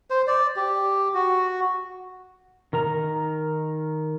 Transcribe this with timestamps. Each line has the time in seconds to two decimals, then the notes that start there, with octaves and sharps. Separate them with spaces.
0.10 C5
0.27 D5
0.56 G4
1.14 F#4
2.73 D#3 A#4 A#5